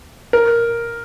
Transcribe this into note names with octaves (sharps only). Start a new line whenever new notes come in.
A#4